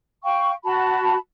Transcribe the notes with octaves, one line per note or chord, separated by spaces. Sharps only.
F5 G5 C#6
F#4 A5 B5